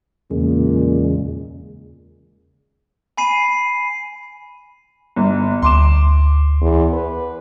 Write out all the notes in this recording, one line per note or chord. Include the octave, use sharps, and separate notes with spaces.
E2 A#2 C#3 G#3
G#5 B5 C7 D#7
G1
D2 C6 D6 E7
E2
B4